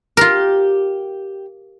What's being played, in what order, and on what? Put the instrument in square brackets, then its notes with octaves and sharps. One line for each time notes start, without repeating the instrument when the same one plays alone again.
[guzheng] F4 A#4 [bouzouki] G4